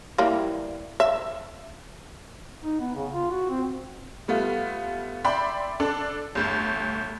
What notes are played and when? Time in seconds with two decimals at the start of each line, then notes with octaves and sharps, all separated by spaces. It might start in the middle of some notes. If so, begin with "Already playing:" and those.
0.18 E3 G3 A#3
1.00 E5
2.64 D#4
2.80 B3
2.96 C#3
3.13 F4
3.31 F#4
3.49 C4
4.28 G3 A3 B3 F4
5.25 D5 E5 G5 B5 C6
5.80 D4 A4
6.35 G1 D2